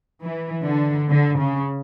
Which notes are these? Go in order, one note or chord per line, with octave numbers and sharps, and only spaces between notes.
E3
D3
D3
C#3